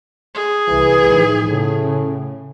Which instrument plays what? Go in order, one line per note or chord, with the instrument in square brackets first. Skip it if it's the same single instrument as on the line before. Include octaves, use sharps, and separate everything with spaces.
[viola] G#4
[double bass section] C2 [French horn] E3
[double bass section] A2 D#3 F3
[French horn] A2 [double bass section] C#3